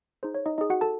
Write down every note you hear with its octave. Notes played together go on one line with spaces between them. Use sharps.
D#4 G#4 C5
C#5
D#4 D#5
D#4 D#5
G#4
F#4 F#5
A4 A5